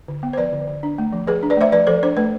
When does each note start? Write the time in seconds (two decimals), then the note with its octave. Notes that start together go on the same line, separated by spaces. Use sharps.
0.08 D3
0.23 B3
0.33 C5
0.37 F3 B4 D5
0.52 D3
0.68 D3
0.83 D4
0.98 A3
1.13 F3
1.27 F3 G#4 B4
1.43 D4
1.50 B4 D5
1.57 A3 C5 E5
1.72 F3 B4 D5
1.87 F3 A4 C5
2.03 D4 C5
2.17 A3 B4